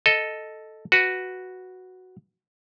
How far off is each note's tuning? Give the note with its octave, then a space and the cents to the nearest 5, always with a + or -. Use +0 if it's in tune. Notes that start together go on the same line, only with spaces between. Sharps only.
A4 +0 D#5 +0
F#4 +0 B4 +0